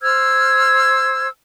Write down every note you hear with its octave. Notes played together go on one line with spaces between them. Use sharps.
C5 E6 F6 G#6